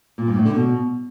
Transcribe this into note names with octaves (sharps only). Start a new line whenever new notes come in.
A#2
G2
A2
D3
B2